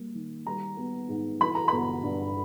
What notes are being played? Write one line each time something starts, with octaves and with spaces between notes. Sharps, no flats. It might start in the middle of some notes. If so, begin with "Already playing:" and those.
Already playing: G3 A#3
D#3
G3 A#5
B3
G#2
E3 B5
A#5
G1 B5
G2